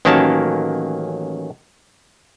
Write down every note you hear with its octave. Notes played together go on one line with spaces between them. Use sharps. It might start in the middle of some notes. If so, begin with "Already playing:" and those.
A1 D#3 F#3 A#3 C#4 A5